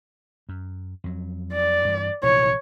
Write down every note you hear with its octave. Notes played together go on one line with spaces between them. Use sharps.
F#2
F2 F#3
D5
G2 E3
A#1 C3 E3 C#5